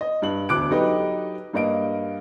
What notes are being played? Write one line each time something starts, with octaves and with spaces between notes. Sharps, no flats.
D#5
G2 F#7
E1 D2 D3 D6 F#6 D7
F#3 D#4 G4 A4 B4 D#5
G2 A#3 D#5 D7